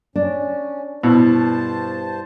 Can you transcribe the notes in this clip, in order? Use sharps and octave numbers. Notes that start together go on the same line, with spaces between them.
C#4 D4
G2 B2 E4 C5 A5